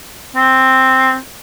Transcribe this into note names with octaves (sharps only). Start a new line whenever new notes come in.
C4